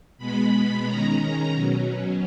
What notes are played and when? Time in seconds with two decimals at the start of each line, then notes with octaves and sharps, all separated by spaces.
0.18 B2 G#3 B3 B5
0.85 D#3 G#3 C#4 A#5
1.51 B2 F#3 C#4